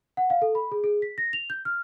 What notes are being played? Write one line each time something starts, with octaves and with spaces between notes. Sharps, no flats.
F#5
F5
A4
B5
G#4
G#4
B6
A#6
F7
G6
F6